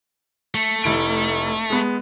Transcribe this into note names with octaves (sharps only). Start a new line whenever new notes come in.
A3
F1 E4 D7
G#3 B3